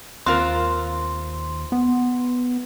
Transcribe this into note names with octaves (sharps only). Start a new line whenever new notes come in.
D#2 C4 F4 A#4 C6
B3